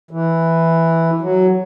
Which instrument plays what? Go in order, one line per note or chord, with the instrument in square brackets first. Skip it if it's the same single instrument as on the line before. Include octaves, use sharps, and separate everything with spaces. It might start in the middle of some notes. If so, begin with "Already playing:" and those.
[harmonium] E3
F#3